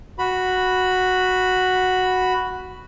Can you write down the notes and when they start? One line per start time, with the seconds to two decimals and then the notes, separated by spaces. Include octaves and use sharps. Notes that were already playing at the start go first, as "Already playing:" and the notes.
0.18 F#4 B5